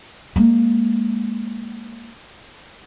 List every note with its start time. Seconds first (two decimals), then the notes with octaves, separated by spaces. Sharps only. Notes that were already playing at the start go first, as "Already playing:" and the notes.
0.36 G#3 A#3